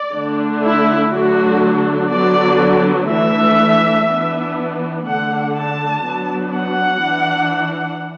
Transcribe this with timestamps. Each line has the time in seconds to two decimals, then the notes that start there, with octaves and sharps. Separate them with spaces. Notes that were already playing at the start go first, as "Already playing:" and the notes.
Already playing: D5
0.14 D3 A3 D4
0.63 E4
1.12 D3 F#3 A3 D4 F#4
2.10 D3 F#3 B3 D4 D5
3.09 E3 A3 D4 E5
4.07 E3 B3 D4
5.05 D3 A3 D4 F#5
5.55 A5
6.04 F#3 B3 D4
6.53 F#5
7.02 E3 D4